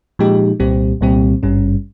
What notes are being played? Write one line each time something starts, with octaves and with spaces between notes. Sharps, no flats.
A#2 F3 G#3 D#4 G4
C2 A#2 G3 C4 G4
C2 A#2 G3 C4 G4
G#1 G2 G3 C#4